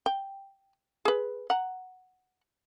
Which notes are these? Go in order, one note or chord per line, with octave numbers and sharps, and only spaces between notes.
G5
G#4 B4
F#5 A#5